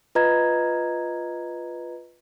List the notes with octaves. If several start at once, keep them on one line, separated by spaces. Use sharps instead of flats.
F4 B4 D#5 A#5 G#6